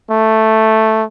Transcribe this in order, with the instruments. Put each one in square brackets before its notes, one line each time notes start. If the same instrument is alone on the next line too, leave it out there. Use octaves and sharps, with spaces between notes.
[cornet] A3